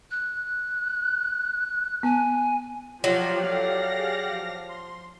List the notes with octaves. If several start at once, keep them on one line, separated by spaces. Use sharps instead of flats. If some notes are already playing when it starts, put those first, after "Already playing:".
F#6
B3 G#5
F3 F#3 F4 G4 D5 F#5
A4 F5 A#6
G#4
F3
C6